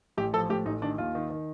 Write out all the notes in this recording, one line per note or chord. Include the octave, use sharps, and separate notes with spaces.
A1 G4
F3 A4
A2 G4
A1 D#4
D#3 D4
D#2 F4
D#3
D#3